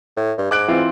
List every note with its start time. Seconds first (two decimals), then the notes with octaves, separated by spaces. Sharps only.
0.17 A2
0.38 G2
0.51 G#2 D6 F#6 D7
0.68 E3 C4 F4